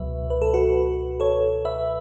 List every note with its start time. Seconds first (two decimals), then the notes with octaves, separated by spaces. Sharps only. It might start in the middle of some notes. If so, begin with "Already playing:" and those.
Already playing: C#2 B2 F#3 B4 E5
0.30 B4
0.42 A4
0.54 F#4 B4
1.20 A4 C#5
1.65 B4 E5